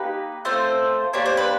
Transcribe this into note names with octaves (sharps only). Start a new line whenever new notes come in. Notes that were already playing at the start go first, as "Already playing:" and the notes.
Already playing: A#3 D#4 G4 B4
A3 C4 F4 A4 C5
A#3 D4 G4 C#5
C5
B4